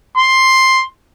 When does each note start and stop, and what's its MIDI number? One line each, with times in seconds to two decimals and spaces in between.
0.17 0.85 84